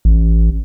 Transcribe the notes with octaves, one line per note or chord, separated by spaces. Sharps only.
A1